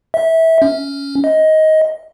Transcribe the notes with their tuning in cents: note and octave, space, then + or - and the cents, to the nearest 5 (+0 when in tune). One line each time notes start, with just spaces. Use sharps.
E5 -20
C#4 +10
D#5 +15